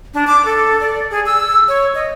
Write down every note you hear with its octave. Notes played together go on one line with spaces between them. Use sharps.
D4
D6
A4
D5
G#4
E6
C#5
D#5